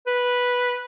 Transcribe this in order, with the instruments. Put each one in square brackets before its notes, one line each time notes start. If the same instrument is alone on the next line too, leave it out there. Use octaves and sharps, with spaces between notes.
[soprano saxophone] B4